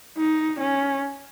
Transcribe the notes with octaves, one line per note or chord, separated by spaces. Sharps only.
D#4
C#4